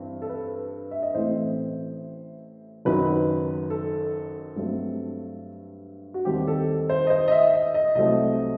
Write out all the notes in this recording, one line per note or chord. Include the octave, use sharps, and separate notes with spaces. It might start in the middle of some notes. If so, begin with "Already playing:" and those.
Already playing: G2 E3 C4
A4
B4
E5
D#5
A1 A2 E3 A3 C4 C5
F#1 F#2 D#3 F#3 B4
A4
G2 F#3 A3 C4
F#4
D#2 D#3 G3 C4 G4
A4
C5
D#5
C5
D#5
E5
D#5
D#5
C2 C3 F#3 A3 C4 D#5